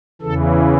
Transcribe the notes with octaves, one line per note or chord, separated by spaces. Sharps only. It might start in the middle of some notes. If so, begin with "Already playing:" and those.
E2 C#3 E3 A4